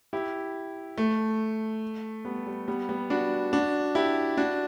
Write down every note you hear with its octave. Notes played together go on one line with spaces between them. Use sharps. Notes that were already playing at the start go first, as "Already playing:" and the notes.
E4 G4
A3
G3 B3
G3
G3 B3
G3 B3
D4 F#4
D4 F#4
E4 G4
D4 F#4